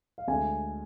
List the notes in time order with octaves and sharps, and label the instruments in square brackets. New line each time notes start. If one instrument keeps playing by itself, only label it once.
[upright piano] F5
[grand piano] D2 D3 G#3 [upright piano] G#5